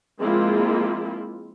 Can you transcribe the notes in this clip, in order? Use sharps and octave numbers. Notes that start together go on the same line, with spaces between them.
F3 G#3 A#3 C4 E4 F4